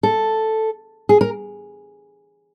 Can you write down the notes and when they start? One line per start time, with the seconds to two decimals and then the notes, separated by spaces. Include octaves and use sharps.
0.03 A4
1.09 G#4
1.21 A#4